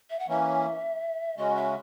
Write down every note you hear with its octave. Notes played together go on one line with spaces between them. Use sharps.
E5
F#5
E3 A#3 C#4 E5
C#3 G#3 C#4 F#4 D#5
E5